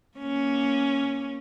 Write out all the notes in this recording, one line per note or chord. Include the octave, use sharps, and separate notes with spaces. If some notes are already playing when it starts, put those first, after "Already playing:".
A#3 C#4